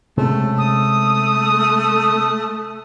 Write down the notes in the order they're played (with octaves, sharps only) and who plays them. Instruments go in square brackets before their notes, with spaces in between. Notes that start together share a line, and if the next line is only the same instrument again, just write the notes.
[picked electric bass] C3 G#3 C#4 [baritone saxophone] A3
[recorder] D#6